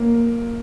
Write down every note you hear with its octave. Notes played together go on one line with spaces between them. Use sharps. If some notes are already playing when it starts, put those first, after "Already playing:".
Already playing: A#3